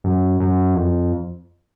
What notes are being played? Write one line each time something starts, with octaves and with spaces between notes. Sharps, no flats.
F#2
F#2
F2